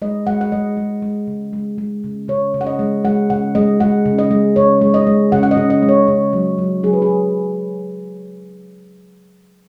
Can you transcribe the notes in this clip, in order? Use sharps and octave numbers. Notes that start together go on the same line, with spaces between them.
G#3 D#5
G#3 F#5
F#5
G#3 D#5
G#3
G#3
C#3
G#3
G#3
C#3
C#3 C#5
C#3
F#5
D#5
G#3
G#3 F#5
C#3 F#5
G#3 D#5
G#3 F#5
C#3
D#5
G#3
C#3 C#5
G#3
D#5
G#3
C#3 F#5
F#5
D#5
C#3
D#5
G#3
C#5
C#3
F#3
F#3
F#3 G#4
B4
G#4
F#3